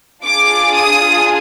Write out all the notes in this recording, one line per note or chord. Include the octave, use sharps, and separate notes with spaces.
D4 F4 G#4 D6
D#6